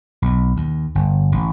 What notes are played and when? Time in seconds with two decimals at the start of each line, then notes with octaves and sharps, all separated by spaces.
0.22 B1
0.57 D#2
0.95 G1
1.32 A1